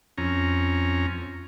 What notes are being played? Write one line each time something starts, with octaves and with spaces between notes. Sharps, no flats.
F2 C#4 A#5